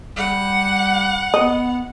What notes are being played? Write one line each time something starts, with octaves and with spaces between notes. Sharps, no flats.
G3 F#5
B3 D#5